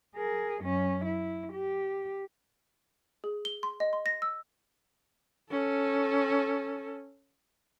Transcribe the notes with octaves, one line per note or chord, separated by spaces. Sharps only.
G#4 A#4
F#2 C#4
E4
G4
G#4
G7
C6
D#5
C6
A#6
E6
C#4 A4